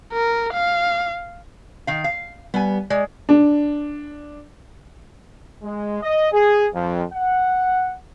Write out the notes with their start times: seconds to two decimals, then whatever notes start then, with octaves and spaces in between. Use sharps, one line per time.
0.13 A#4
0.53 F5
1.87 D#3 F5
2.04 F5
2.54 G3 B3 G#5
2.90 G#3 D5
3.29 D4
5.63 G#3
6.02 D#5
6.33 G#4
6.74 F2
7.13 F#5